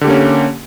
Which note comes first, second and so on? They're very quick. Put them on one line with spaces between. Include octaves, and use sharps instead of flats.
D3 G4 A#3 C#4